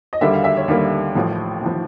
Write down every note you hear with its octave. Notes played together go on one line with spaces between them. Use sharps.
D#5
D#2 D3 G3 A#3 E5
F5
E5
C#5
D#2 D3 G3 A#3 F5
A1 A2 F3
A1 A2 F3